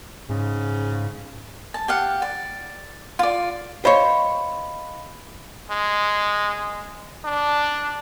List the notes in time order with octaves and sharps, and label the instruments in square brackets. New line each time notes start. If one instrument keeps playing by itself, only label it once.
[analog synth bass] G#2 [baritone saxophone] C#3
[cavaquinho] A5
G4 F5 F#5
D5
F4 D5
[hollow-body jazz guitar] C5 C#5 [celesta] D#5 F5 B5
[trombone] G#3
D4